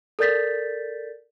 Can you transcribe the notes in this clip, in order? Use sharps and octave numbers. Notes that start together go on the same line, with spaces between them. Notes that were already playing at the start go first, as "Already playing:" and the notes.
A4 A#4 D5 G6 A6 B6